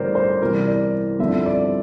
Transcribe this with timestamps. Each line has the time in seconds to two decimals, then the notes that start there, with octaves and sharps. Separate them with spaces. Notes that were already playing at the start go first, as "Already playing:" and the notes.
Already playing: A1 G2 D3 A#4 C5 D5
0.15 C5
0.42 C2 C3 E3 G3 A#4
0.67 D5
1.19 G2 D3 F3 C4 E4 E5
1.46 D5